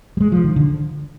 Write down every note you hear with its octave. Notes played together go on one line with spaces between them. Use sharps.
G3
G#3
F3
D#3
D3